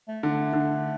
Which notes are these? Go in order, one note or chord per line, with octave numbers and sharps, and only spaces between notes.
A3
D3
A3
D3